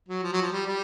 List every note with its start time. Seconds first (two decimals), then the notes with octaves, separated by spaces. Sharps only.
0.09 F#3
0.23 F3
0.33 F#3
0.42 F3
0.52 G3
0.66 G3